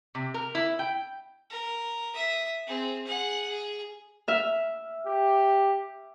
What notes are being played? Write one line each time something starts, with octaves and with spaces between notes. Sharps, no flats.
C3
A#4
E4
G5
A#4
E5 D#6
C4 G#4
G#4 F#5
G#4
E5 F6
G4